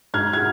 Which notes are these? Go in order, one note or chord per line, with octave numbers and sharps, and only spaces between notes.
G#2 F6 G#6
F6 G#6